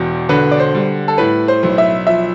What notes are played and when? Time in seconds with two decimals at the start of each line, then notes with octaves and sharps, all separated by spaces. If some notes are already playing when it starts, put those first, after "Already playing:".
Already playing: E1 E2
0.29 D3 B4
0.51 D5
0.60 C5
0.75 G3
1.08 A4
1.18 A2 B4
1.48 C5
1.63 B1
1.78 E5
2.07 F3 E5